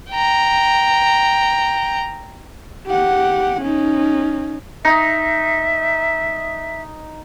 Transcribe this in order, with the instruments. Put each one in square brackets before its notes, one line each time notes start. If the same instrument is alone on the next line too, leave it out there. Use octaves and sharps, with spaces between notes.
[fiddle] G5 A#5
[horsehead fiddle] G4 F#5
C#4 D#4
[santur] D#4 [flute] E5